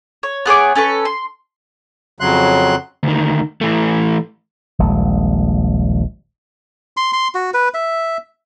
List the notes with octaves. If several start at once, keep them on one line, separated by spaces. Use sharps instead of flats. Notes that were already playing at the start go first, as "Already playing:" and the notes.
C#5
B3 G#4 C#5 D6
C#4 A4 B4 C#6
C6
F2 C#3 F#3 C6 F#6
D2 D#3
E3 A3
D#1 A#1 G#3
C6
C6
F#4
B4
E5